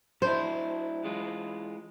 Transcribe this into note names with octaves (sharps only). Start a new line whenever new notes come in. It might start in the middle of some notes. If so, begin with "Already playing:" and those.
F#3 D4 E4 C5
E3 G#3 F4